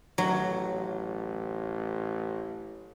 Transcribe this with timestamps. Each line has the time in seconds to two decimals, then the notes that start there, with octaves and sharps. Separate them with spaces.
0.18 A1 F#3